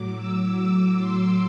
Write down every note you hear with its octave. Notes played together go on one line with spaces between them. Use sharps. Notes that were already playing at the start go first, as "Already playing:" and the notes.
Already playing: A2 F#3 D6
E6
D6
C6